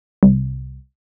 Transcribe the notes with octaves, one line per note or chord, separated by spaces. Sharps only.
C2